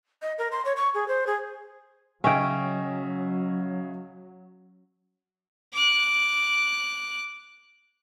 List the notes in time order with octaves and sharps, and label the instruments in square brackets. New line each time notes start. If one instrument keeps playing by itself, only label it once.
[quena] D#5
A#4
C6
C#5
C#6
G#4
C5
G#4
[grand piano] C#3 D#5 E5 [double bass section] F#3 [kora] C#4 G5
[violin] D6 F#6